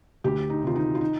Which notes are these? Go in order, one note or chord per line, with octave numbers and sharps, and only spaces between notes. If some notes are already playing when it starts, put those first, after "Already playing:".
D2 G4
D#4
C3 D#3 F4
D#4
F4
D#4